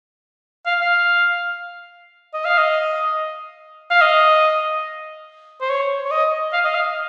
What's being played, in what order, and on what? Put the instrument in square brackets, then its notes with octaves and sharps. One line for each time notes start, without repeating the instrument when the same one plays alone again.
[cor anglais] F5
F5
D#5
F5
D#5
F5
D#5
C5
C#5
C#5
D#5
F5
D#5
F5